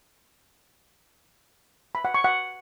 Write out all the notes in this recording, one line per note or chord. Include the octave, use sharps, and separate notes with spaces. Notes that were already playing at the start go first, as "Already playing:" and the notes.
B5
F#5
C#6
F#5